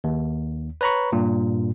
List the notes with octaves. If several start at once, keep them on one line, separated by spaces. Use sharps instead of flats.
D#2
B4 C#5 A#5 B5 C#6
G2 A#2